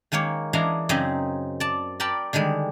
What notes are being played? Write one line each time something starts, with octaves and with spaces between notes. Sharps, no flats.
D#3 G#3 A#3 C#5
E3 G#3 D4 G#4 F5 A#5
F#2 C#3 C4 D#4 G#4 D#5
D5 A5
A#4 D5 G5 A5 B5
D3 D#3 G3 G#3